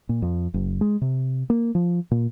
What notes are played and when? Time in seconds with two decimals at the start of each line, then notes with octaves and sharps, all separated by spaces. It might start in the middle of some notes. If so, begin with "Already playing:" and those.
0.09 A#2
0.22 F2
0.54 F#1
0.81 G#3
1.01 C3
1.50 A#3
1.75 F3
2.11 A#2